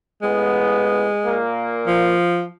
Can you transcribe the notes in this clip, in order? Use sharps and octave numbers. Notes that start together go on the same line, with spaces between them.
A1 G#3 B3
A#2 A#3
F3